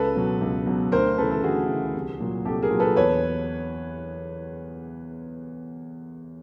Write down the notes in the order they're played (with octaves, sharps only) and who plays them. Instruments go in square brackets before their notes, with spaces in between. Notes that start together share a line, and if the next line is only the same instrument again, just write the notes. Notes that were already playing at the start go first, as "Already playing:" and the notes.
Already playing: [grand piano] C#2 A4 B4
B2 F#3
C#2
B2 F#3
D2 A#4 C5
C#3 E3 A4 B4
A4
D2 F#4 G#4
C#3 E3
C2
A#2 F#3
C2 G4 A4
G#4 A#4
A#2 F#3
A4 B4
E2 B4 C#5